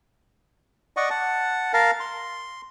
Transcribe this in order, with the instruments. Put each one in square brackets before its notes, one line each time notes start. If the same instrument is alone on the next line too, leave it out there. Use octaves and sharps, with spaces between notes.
[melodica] D5 D#5 F#5 C#6
F#5 A5
A#4 F5 A5
C6